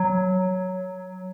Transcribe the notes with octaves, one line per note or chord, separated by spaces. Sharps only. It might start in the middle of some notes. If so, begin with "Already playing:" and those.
Already playing: F#3